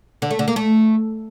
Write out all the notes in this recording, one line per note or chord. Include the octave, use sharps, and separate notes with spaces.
D3
A3
D3
A#3
A3